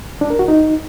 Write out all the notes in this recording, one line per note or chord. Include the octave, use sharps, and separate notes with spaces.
D4
A#4
F#4
D#4